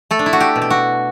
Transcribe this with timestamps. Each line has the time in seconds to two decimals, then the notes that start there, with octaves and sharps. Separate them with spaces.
0.11 A3 A4
0.19 D4
0.26 E4
0.33 F#4
0.40 G4
0.55 B2
0.62 G4
0.70 F#4